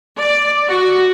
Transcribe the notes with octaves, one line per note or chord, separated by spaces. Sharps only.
D5
F#4